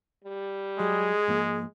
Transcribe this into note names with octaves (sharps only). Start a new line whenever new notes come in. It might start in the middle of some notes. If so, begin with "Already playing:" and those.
G3
F#3 G#3 G#4
G#2 F3 A#3